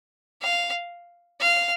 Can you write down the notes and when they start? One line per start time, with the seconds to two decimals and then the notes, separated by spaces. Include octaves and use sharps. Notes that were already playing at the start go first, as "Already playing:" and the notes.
0.42 F5
1.40 F5